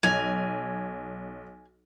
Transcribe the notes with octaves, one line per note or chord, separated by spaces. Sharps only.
B1 G#5 F7